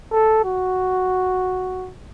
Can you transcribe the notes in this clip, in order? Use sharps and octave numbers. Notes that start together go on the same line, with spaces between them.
A4
F#4